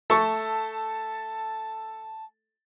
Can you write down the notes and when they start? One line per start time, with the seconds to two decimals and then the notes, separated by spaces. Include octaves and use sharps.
0.10 A3 A4 A5 C#6